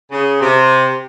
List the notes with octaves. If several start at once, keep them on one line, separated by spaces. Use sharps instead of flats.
C#3
C3